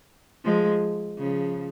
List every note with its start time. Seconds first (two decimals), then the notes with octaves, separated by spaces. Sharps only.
0.45 F3 G#3
1.18 C#3 F3